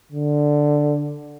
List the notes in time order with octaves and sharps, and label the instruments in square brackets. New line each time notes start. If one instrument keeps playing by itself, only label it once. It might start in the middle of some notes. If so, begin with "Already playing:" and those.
[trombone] D3